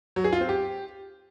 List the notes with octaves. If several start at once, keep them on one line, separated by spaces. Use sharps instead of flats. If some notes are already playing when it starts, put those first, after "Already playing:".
F#3
G#4
F4
C4
G4